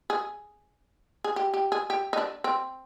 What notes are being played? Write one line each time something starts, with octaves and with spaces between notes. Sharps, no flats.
G#4
G#4
G4
G4
G#4
G4
D#4
D4
C4